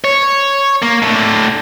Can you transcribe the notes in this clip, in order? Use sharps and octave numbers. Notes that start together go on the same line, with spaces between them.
C#5
A#3
A2 D3